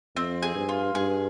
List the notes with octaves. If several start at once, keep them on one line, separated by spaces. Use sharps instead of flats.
F2 C4
G#4
G2
F4
G2 G#4